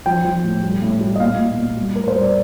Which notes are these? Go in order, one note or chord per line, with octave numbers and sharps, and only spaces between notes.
F3 G5
F3
A2
G3
A2
G3
D#5
A#2 F5
A#2
A#2
G3
A2 A#4
C5
G3
D5